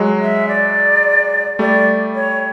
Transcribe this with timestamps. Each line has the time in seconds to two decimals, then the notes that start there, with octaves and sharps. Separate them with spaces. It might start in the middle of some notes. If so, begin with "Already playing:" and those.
Already playing: F#3 G#3
0.21 E5
0.48 D5
1.59 G3 A3 D5
2.15 C#5